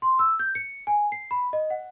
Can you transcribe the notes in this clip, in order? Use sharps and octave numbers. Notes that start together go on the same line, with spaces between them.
C6
E6
G6
C#7
G#5
C7
B5
D#5
F#5